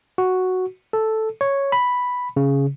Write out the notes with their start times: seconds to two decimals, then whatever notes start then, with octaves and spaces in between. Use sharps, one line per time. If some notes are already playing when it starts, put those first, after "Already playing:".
0.18 F#4
0.93 A4
1.41 C#5
1.72 B5
2.37 C#3